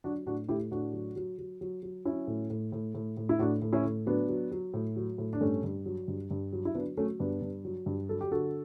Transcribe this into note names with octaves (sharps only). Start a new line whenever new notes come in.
F#3 D4 F#4
A2 D4 F#4
A2 E4 G4
A2 D4 F#4
F#3
F#3
F#3
F#3
F#3
F#3 C#4 E4
A2
A2
A2
A2
A2
E4
A2 D4 F#4
A2
C#4 E4
A2
F#3 B3 D4
F#3
F#3
A2
F#3
A2
D4
G2 A3 C#4
G2
F#3
G2
G2
F#3
E4
F#3 B3 D4
F#3 A3 C#4
G2 B3 D4
G2
F#3
G2
F#3 A4
G4
D3 F#4 A4